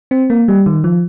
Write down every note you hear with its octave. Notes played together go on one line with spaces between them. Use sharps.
C4
A#3
G3
D#3
F3